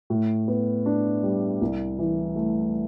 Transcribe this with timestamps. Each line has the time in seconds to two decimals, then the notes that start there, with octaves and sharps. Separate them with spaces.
0.10 A2
0.48 B3
0.86 D4
1.23 G3
1.61 C2
1.99 E3
2.36 A3